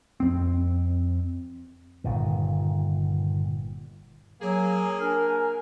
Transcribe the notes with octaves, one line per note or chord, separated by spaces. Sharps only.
F2 C4
G1 A#2 D#3
F#3 A#3 G#4 G#5
D4 A#4 G#5